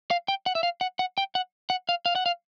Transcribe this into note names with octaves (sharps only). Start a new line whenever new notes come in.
F5
G5
F#5
E5
F5
F#5
F#5
G5
F#5
F#5
F5
F5
F#5
F5